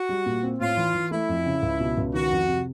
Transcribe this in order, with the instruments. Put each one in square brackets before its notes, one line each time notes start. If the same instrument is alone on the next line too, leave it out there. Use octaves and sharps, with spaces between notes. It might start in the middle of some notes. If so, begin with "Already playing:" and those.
Already playing: [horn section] F#4
[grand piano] G3
A#2
C4
[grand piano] A2 [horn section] F4
[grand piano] E3
E3
[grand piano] A3 [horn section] E4
[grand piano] F2
C#3
C#2
B2
C#2
[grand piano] D#3 [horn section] F#4
[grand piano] F2
C3